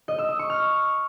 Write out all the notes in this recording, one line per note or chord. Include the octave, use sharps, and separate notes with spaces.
D#5
E6
D#6
C#6
F6